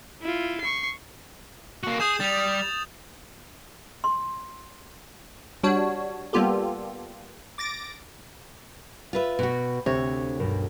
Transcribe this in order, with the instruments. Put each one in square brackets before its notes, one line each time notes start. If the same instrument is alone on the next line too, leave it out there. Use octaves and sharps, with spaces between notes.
[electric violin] E4 F4
C#6 C7
[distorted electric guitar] A#3 F#4
[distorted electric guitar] G#4 [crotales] D#6 G6 E7
[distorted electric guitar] G3 [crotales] A6 F7
[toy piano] C6
[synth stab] G3 D4 F#4 C#5
G3 A#3 B3 F4 G4 A4
D6 A6 A#6 D7
[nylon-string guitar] F4 B4 E5
[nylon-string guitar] B2 F#4 [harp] G5 B5
[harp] D2 [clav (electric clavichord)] C3 [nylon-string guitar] C#5
[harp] B1 G2 A#4